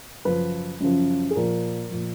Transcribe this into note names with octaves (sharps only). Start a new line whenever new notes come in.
F#2 C#3 F3 B4
F#2 C#3 F3
G#4
A#2 F3 A#4
A#2 F3